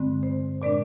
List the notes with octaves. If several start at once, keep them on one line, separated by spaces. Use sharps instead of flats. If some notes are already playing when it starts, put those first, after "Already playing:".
Already playing: G2 D3 G#3 C4
C5
A#2 G#3 D4 D5